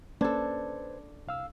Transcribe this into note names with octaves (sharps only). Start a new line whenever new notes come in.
A#3 C#4 D4 A4 B4 C5 G#6
C2 F5 E6